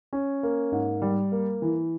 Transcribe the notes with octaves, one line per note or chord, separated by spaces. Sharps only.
C#4
A#3
G#2
G3
A#3
E3